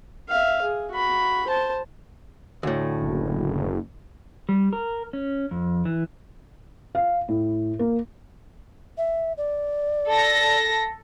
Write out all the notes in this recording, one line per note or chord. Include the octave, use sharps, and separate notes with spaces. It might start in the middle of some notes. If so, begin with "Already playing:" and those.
E5 F5
G#4
F#4 B5
C5 A5
D2 A2
F#1
G3
A#4
C#4
F2
E3
F5
A2
A#3
E5
D5
A4 A#6